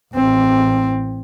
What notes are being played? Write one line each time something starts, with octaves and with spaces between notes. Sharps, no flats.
A1 C4